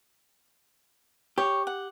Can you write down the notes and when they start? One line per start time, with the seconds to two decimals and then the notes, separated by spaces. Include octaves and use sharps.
1.38 G4 C#5
1.67 F#5